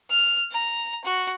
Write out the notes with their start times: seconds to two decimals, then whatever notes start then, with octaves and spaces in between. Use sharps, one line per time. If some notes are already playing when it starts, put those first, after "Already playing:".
0.10 F6
0.52 A#5
1.05 F#4